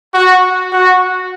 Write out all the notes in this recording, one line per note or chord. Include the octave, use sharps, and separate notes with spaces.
F#4
F#4